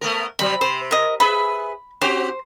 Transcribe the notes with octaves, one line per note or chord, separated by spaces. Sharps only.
A3 B3 A#4
C3 F#3 G3 B5
C3 C5
A#4 D#5
G#4 B4 E5 B5
C4 F#4 G4 C5